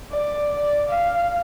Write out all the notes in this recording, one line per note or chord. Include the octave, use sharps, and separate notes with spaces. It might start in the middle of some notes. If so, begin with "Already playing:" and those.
D5
D5
F5